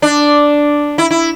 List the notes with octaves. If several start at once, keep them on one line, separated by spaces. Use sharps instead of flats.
D4
E4
E4